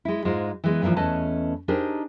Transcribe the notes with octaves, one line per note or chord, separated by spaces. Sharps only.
G#3 E4
G#2 G#3 F4 C5
E3 G#3 B3
G2 A#2 C#3 E3 F3
E2 A3 C#4 B4 D#5 A5
D4 D#4 G4 G#4 A#4 C5